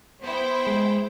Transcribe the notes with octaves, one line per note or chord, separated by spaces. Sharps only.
B3 E4 C5 G5
G#3